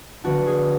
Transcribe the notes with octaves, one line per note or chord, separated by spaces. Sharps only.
D3 F3 B3 D4 F#4
G#4